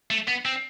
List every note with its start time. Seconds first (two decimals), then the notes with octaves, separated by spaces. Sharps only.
0.11 A3
0.28 B3
0.45 C4